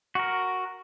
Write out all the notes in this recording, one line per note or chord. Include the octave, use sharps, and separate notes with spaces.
F#4 A#4